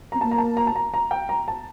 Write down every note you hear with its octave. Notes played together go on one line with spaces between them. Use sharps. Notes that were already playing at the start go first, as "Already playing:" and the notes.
C4 A#5
A#3 A5
A#5
A5
A#5
A5
A#5
A#5
G5
A#5
A5